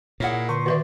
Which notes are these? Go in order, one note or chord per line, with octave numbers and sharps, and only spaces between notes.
A#2 A#3 E4 G#4 C#5 F#5
D3 B4 C6 C#6
D#3 F#4 B4 C#5 D5 E5